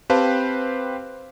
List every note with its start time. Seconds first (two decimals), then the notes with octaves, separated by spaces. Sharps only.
0.10 C4 G4 B4 C5 F5 A5